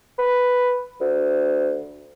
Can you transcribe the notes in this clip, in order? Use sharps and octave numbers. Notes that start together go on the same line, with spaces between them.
B4
D2